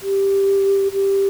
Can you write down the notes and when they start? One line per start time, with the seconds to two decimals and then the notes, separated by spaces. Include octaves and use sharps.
0.02 G4
0.93 G4